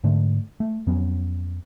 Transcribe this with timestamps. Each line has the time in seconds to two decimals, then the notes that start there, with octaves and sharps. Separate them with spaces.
0.04 G#2 D3 A3
0.60 A3
0.87 F2 F#3 B3 C#4